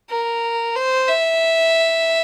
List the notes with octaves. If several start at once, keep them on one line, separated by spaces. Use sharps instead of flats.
A#4
C5
E5